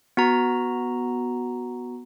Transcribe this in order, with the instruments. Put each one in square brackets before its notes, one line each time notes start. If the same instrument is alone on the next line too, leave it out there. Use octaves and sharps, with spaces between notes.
[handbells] B3 F#4 A#5